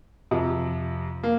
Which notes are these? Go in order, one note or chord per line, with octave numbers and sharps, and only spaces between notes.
F2 C3 F3
A#3